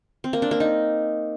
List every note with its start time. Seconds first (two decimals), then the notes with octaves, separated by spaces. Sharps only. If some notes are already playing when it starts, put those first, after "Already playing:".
0.24 C4
0.33 A#3
0.42 D4
0.51 A#3
0.60 D#4